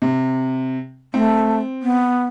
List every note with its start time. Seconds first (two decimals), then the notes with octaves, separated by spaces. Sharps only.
0.02 C3
1.14 A3 C4
1.83 B3